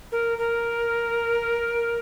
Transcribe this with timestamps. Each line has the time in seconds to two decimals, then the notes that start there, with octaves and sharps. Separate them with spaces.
0.12 A#4
0.38 A#4